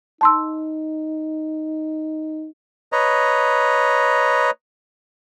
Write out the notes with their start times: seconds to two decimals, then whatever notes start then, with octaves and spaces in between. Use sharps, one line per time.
0.21 D#4 A5 C6 E6
2.92 B4 C#5 D#5 A#5